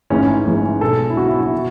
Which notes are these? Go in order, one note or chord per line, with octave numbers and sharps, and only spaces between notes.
A1 G#2 E3 G#3 C#4
A1 G#2 E3 G#3
B1 B2 G#3 A4
E4
B1 B2 G#3 F#4
E4
F#4
B2